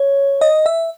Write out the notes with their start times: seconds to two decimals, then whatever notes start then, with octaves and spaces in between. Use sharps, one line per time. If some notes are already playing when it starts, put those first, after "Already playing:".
Already playing: C#5
0.41 D#5
0.66 E5